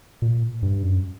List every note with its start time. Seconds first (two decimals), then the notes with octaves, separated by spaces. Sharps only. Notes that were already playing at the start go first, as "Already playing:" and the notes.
0.22 A#2
0.63 G2
0.83 F#2